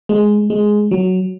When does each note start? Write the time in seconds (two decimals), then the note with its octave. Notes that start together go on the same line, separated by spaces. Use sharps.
0.09 G#3
0.50 G#3
0.91 F#3